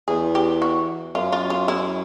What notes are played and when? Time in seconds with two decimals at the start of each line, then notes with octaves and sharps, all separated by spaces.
0.08 E2 G#4
0.35 G4
0.62 F#4
1.15 F#2 F4
1.32 F4
1.50 F4
1.68 E4